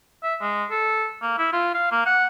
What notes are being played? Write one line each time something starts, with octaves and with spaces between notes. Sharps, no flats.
E5
G#3
A4
A#3
E4
F4
F5
A#3
F#5